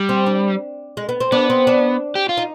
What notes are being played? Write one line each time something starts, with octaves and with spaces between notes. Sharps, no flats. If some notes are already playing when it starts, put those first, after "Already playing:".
Already playing: G3
C4
D4
G#3
B3
C4
B3 D4
C4
D4
G4
F4
D#4